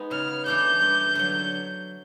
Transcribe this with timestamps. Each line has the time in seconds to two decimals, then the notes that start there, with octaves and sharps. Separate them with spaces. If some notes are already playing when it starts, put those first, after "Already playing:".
Already playing: G#3 B3 D#4
0.11 C#3 F6
0.46 E3 A3 D4 G6
0.81 G2
1.15 D3 F#3